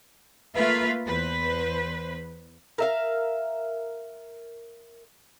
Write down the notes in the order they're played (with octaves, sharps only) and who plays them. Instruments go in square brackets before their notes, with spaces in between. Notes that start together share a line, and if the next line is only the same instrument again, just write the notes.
[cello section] A3 A#3 F4 B4 E5 F5
E2 B4 C5
[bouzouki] A#4 E5 F5